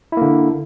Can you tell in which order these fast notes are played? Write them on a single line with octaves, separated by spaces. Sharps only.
E4 A#3 D3